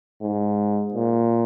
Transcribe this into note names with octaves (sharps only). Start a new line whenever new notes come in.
G#2
A#2